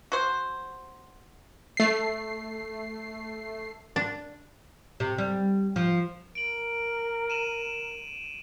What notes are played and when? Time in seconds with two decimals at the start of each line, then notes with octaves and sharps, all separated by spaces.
0.12 F#4 C5
1.77 A3 C7
3.96 D4
5.00 C3
5.18 G3
5.76 F3
6.35 A#4 D7 F#7
7.30 D#7 E7 F#7